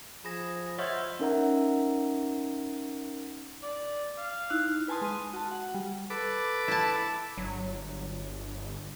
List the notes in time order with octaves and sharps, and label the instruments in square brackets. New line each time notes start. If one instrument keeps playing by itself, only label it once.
[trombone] F3 [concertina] G#4 [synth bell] B5 A#6
[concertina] C5 E6 F6 [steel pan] C#5 [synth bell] D#5 E5 F#5
[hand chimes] C#4 D#4 A#4 E5 F#5 A#5
[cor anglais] D5
F5
[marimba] D#4 E4 F#6
[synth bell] B4 G#5 A5 C6 D#6
G#3 C6 F6 D#7
F#4 A5
F#5
G3
[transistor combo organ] A4 B4 D6
[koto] E4 A5
[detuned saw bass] G1 [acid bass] F#3